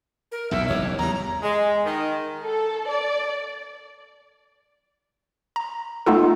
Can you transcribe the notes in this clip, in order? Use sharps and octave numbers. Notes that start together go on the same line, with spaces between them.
A#4
B1 E2 A#2 E5
F#1 B1 E3 C#5
E2 G3 A#5
G#3
D#3
A4
D5
A#5
A3 B3 D#4 F4 A4